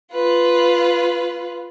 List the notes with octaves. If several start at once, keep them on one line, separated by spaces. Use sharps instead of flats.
F4 B4